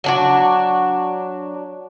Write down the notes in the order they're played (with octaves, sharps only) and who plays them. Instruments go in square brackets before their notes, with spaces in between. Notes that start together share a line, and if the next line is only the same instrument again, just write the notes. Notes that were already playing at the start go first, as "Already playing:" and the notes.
[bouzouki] F#3 D4 F#4